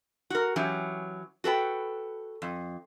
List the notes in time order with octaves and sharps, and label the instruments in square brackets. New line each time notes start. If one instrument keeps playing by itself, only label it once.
[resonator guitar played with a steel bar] F#4 A#4
E3 F#3 C#4 G4
F#4 A4 B4 G5
F2